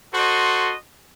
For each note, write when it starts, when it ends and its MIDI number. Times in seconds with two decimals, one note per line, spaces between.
0.14 0.74 66
0.14 0.74 69
0.14 0.74 72
0.14 0.74 75
0.14 0.74 84